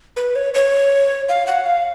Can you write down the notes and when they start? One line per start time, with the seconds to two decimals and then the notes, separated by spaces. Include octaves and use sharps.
0.16 B4
0.36 C#5
0.54 C#5
1.29 F5
1.47 F#5
1.66 F5